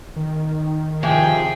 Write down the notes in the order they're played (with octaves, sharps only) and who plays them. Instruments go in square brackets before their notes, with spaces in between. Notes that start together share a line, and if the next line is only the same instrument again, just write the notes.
[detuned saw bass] D#3
[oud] C3 E3 F3 [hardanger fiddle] G#4 G5